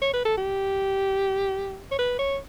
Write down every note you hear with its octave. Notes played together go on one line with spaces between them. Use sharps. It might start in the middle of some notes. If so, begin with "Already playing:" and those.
C#5
B4
A4
G4
C#5
B4
C#5